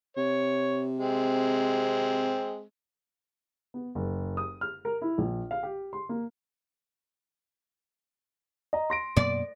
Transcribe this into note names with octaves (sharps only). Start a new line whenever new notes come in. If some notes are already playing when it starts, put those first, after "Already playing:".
C3 C#5
G#3 C4
B3
F#1
D#6
F6
A#4
E4
A#1
F5
G4
C6
A#3
D#5 A#5
C6 A#6 D7
F#2 B2 A#3 D5